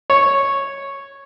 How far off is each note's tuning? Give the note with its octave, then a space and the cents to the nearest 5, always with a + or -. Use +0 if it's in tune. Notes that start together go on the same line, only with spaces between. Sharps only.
C#5 -5